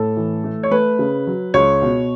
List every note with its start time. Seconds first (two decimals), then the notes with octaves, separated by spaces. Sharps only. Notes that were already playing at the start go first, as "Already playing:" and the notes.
Already playing: A2 A4
0.17 E3
0.44 A3
0.63 C#5
0.71 A3 B4
0.99 C#3
1.27 F#3
1.54 C#2 C#5
1.82 B2